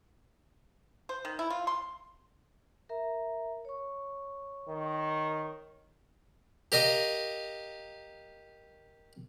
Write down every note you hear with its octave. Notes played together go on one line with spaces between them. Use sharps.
C5
D#3
E4
F4
C6
A#4 E5 A#5
C#5 C#6
D#3
G4 A#4 D#5 F5